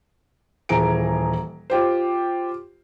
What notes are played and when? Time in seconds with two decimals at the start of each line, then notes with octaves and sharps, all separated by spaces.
0.69 D#1 E3 G#4 G#5 A#5 D7
1.70 F4 G4 C5